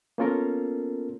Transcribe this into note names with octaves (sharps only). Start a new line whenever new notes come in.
A#3 B3 C#4 F4 A4 A#4